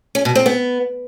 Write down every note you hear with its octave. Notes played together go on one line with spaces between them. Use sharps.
C#4
B2
C4
B3